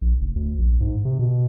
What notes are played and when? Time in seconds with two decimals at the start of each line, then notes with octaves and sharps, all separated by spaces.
0.01 A#1
0.21 F1
0.36 D2
0.58 A#1
0.81 G#2
1.05 C3
1.19 B2